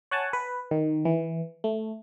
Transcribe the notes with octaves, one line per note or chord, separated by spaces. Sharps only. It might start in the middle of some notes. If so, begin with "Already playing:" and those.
C#5 F#5 G#5 A5
B4
D#3
E3
A3